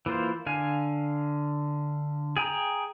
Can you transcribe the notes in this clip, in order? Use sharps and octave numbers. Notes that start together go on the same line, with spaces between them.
E3 A#3 F4 C5
D3 F5 G#5
G#4 G5 A#5